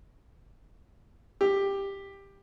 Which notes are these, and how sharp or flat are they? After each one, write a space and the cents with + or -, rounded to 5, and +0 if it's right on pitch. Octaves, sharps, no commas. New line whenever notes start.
G4 +10